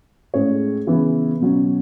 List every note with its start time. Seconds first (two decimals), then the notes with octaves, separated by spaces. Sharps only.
0.34 A2 G#3 C#4 G#4 C#5
0.87 C#3 E3 B3
1.40 B2 F#3 C#4